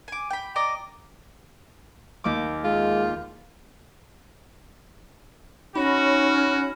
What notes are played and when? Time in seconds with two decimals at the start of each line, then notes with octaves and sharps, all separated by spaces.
0.08 G#5 D6
0.30 G5 B5
0.56 D5 D#5 A#5 D6
2.24 D#2 A#3 D6
2.64 G#3 F4
5.76 C#4 D#4 F#4 C#5 B5 A#6